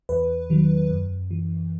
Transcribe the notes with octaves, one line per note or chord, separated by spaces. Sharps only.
E2 B4
D#3 F#3
F#2
E3